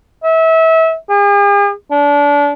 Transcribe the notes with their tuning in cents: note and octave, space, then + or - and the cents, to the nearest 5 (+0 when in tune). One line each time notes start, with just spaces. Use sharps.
E5 -30
G#4 -45
D4 -30